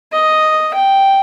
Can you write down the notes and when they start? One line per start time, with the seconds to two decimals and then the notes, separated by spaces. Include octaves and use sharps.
0.12 D#5
0.74 G5